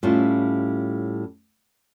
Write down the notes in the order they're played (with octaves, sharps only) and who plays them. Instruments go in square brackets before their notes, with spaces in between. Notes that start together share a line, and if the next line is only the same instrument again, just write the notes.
[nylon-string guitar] A2 G3 C#4 E4 F4